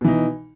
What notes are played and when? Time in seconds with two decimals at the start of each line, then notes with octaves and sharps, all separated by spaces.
0.01 B2
0.04 E3
0.08 D#4